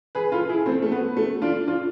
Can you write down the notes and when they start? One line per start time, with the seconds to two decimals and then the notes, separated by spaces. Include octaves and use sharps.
0.15 G#4 B4
0.32 F4 A4
0.49 E4 G#4
0.66 A3 C4
0.82 A3
0.92 B3
1.17 A3
1.42 D4 F4
1.67 D4 F4